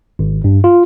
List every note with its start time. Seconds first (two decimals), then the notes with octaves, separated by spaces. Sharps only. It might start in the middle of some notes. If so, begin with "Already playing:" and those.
0.19 G#1
0.44 G2
0.64 F4